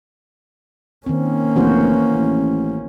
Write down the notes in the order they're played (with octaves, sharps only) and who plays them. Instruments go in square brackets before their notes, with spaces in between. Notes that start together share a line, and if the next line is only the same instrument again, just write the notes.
[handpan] D#3 C4 [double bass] A#3 C#4
[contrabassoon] F1 [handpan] E3 F#4 C5
[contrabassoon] A1